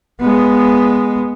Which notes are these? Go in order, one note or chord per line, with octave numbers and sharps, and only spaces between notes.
G#3 B3